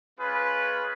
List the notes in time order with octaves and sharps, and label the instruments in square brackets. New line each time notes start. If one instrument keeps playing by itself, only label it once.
[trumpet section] G#3 C#4 F4 G#4 B4